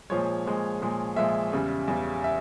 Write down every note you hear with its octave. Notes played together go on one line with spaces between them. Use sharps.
A#2 F3 G#3 C#5
A#2 F3 G#3
A#2 F3 G#3
A#2 F3 G#3 E5
E2 C#3 G3
E2 C#3 G3
E5